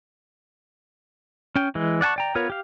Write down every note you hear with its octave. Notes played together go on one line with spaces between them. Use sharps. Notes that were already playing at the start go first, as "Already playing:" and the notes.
C#4 G5
E3 G#3
D5 F#5 G#5 A5 C#6
D5 G5 A#5
B3 F4 A#4 C#5
G4 F5